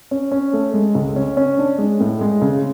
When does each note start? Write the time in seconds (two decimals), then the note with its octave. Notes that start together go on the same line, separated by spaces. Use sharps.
0.11 C#4
0.31 C#4
0.53 A3
0.74 G#3
0.95 C#2
1.16 C#4
1.37 C#4
1.59 D4
1.78 G#3
2.00 A2
2.21 G#3
2.42 C#3